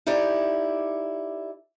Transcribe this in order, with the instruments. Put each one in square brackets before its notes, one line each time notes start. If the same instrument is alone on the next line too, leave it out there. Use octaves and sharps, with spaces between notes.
[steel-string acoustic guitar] D#4 E4 G4 A4 D5